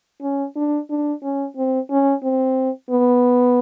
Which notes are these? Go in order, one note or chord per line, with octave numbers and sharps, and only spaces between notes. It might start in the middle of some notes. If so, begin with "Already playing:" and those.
C#4
D4
D4
C#4
C4
C#4
C4
B3